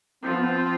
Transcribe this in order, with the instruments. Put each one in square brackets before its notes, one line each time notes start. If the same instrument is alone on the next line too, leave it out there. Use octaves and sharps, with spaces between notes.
[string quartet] F3 F4 [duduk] C4
[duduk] B3
C4